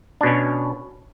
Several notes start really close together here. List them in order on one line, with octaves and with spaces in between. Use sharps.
D4 B2 C#4